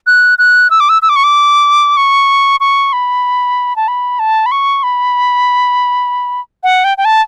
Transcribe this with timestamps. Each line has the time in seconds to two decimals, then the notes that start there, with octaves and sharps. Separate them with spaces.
0.07 F#6
0.39 F#6
0.70 E6
0.80 D6
0.89 E6
1.02 E6
1.09 D6
1.16 C#6
1.24 D6
1.97 C#6
2.60 C#6
2.93 B5
3.76 A5
3.88 B5
4.19 A5
4.46 B5
4.52 C#6
4.83 B5
6.64 F#5
6.84 G5
6.98 G5
7.05 A5